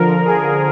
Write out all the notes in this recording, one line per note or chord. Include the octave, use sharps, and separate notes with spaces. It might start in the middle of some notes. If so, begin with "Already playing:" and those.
Already playing: D3 F3 A#4
G#4